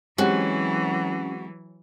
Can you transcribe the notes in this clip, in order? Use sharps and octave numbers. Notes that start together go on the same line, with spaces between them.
E3 F#3 G#3 C4 C#4 F#4 G4